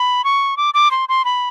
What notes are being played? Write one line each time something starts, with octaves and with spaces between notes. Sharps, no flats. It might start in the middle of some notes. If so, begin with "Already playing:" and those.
Already playing: B5
C#6
D6
D6
C6
C6
B5